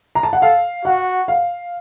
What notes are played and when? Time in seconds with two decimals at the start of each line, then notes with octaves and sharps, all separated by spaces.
0.15 A#5
0.23 A5
0.33 F#5
0.42 A4 F5
0.85 F#4 F#5
1.28 F5